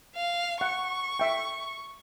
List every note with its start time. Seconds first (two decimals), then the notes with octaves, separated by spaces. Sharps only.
0.16 F5
0.61 F#5 C#6
1.19 E5 G5